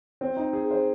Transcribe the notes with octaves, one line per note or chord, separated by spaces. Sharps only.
C4
D#4
G#4
C5